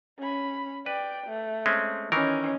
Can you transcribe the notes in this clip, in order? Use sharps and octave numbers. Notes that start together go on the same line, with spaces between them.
C#4 B5
B4 D5 G5
A3
G#3 C4 C#4
D#3 E3 C#4 A#4 D#5